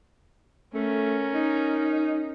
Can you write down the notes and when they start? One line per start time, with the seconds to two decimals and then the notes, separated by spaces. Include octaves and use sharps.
0.74 A3 C#4 A#4
1.34 D#4